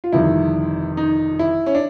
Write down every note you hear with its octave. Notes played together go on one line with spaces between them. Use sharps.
F4
G1 F2 C3 D#3 G3 E4
D#4
E4
C#4
D4